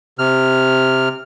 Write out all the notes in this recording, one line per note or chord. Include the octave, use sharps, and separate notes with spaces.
C3 F6